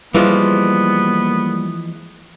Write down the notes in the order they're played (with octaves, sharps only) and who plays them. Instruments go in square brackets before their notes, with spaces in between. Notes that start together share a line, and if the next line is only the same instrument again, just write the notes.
[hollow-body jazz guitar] E3 F3 G#3 [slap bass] G3 [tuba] A#3 [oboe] B3